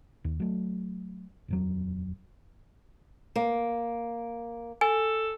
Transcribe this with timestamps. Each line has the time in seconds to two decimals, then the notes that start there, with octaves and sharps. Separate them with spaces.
0.24 D#2
0.40 F#3 A3
1.48 D#1 F2 F#3
3.36 A#3
4.81 A4 G#5